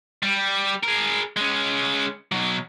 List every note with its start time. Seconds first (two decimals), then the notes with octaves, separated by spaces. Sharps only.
0.23 G3
0.83 G#4 A#4
1.37 G#3 C#4
2.32 B2 F#3